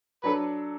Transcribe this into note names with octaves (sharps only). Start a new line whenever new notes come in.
F#3 D4 A4 B4